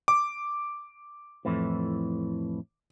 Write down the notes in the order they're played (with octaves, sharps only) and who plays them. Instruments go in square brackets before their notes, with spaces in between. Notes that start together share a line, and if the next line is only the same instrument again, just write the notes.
[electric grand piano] D6
[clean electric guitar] F2 A2 E3